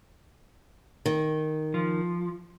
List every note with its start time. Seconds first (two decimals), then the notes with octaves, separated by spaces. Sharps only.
1.06 D#3
1.74 F3